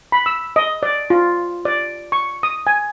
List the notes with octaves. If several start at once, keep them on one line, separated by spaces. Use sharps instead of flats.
B5
E6
D#5
D5
F4
D5
C#6
D#6
G#5